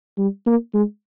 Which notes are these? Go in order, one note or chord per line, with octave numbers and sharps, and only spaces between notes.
G3
A#3
G#3